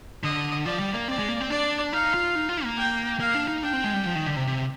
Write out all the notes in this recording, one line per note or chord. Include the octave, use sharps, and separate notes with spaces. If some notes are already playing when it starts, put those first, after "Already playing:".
D3 D#5
F3 D5
G3
A#3
C4 D5
G#3
A#3
C4
D4 D5
D#4 F5
F4
D#4
F4
A#3
G5
A#3 F5
D4
D#4
D4 G5
C4
G#3
G3
F3
D#3
D3
C3
C3